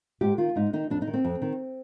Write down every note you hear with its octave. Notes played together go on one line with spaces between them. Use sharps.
G#2 G4
D#3 F4
G#2 D#4
D#3 D#4
F2 D4
D#4
D#3
C4
F2
D#3